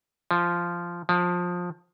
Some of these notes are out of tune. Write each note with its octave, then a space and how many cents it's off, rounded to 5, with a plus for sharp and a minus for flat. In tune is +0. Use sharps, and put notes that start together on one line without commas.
F3 -10
F3 +20